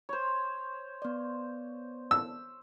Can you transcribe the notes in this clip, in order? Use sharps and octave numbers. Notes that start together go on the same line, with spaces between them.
C5 C#5
B3 D5
E6